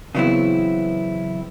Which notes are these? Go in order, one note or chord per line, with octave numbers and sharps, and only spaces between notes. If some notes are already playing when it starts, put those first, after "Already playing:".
C#3 E3 F#3 B3 C4 E4